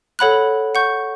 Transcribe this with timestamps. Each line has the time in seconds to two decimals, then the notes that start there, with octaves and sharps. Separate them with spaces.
0.19 A4 C#5 F#5 B5 F#6
0.75 F#5 C#6 G6